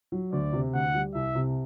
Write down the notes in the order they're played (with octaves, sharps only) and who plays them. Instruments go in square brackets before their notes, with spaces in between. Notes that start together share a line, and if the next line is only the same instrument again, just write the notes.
[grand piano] F#3
[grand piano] D2 [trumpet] D5
[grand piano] C3
[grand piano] D2 [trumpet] F#5
[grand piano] G3
[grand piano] C2 [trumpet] E5
[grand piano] C3